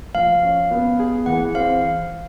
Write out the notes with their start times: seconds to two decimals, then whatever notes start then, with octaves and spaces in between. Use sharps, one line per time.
0.15 F3 F5
0.43 C#4
0.71 B3
0.99 G#4
1.26 E3 F#5
1.55 C4 F5